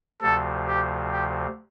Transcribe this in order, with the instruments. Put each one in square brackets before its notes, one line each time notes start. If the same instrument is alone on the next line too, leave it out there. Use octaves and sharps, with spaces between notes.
[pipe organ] D2 C3 F3 [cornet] A4
[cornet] G4
G4